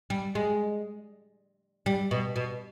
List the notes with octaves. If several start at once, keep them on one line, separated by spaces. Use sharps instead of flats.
G3
G#3
G3
B2
B2